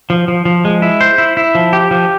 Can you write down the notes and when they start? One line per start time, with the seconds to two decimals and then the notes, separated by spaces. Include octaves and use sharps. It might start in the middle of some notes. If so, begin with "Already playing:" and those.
0.10 F3
0.28 F3
0.45 F3
0.65 G#3
0.82 E4
1.01 C5
1.18 E4
1.37 E4
1.55 F3
1.73 G4
1.91 F3